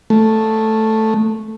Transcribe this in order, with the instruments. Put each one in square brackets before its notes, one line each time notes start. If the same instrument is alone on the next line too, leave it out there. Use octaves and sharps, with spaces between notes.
[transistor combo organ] A3